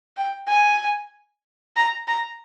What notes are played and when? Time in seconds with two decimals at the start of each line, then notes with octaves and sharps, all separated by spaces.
0.17 G5
0.48 G#5
1.76 A#5
2.07 A#5